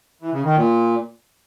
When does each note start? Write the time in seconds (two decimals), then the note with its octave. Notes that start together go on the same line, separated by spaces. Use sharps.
0.21 E3
0.33 C#3
0.44 D#3
0.56 A#2